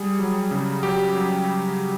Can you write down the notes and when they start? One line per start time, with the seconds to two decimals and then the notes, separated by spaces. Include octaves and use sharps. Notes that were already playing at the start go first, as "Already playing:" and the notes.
Already playing: G3 G#4
0.19 F#3
0.51 C#3
0.83 F#3 G4
1.15 F#3